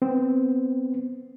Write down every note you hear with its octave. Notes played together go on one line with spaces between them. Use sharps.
B3 C4